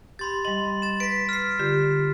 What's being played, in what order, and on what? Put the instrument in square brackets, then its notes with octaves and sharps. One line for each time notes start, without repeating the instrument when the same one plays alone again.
[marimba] G4 [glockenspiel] B5 C6 A6
[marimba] G3 D#5 [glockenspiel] C6
[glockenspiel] A6 E7
[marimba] B4 [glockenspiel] B6 D7
[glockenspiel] F6 C7
[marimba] D3 F4 G4